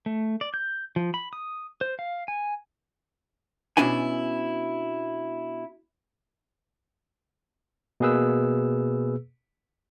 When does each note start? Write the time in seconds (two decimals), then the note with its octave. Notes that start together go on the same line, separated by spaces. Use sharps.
0.06 A3
0.41 D5
0.54 G6
0.96 F3
1.14 B5
1.33 D#6
1.81 C5
1.99 F5
2.28 G#5
3.77 B2 C#4 D4 E4 G#5
8.00 B2 A#3 G#4 B4 E6